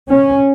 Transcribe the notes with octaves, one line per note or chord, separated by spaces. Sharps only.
C#4